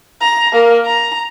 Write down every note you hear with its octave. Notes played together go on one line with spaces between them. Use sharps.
A#5
A#3 A#4
A#5